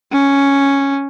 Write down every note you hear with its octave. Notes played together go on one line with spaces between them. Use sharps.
C#4